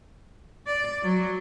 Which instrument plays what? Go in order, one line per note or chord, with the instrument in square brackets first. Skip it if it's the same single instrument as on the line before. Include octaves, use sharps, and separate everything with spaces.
[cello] D5
F#3